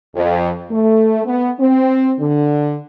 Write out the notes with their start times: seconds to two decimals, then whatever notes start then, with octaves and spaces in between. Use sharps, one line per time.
0.16 F2
0.71 A3
1.25 B3
1.59 C4
2.19 D3